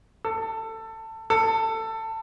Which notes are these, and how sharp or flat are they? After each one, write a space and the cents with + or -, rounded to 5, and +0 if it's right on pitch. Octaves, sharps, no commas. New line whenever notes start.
A4 +20
A4 +20